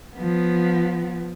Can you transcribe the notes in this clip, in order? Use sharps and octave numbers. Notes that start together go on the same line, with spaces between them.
F3 B3